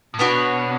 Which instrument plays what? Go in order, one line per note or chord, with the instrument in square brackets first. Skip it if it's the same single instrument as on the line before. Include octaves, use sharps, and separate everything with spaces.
[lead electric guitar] A2
[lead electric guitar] B2 [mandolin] B3 D4 F#4 C#5